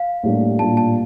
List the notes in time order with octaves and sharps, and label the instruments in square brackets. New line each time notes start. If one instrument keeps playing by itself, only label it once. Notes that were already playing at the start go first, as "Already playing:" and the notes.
Already playing: [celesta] F5
[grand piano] A2 G3 A#3 D4
[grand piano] A#2 G3 D4 F4 [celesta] A5
[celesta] A5